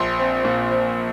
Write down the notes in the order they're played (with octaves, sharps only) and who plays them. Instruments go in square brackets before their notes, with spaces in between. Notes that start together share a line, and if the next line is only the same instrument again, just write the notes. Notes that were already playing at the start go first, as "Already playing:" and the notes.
Already playing: [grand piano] A#1 C6
C4
A#2
F3